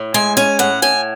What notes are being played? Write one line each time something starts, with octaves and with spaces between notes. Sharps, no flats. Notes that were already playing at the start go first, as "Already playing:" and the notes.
Already playing: A2
G#3 G#5
C#4 G#5
A2 F#5
A2 G#5